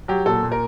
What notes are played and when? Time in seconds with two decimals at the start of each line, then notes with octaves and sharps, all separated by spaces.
0.08 F#3 G4
0.26 A#2 A4
0.43 A#2
0.52 A#4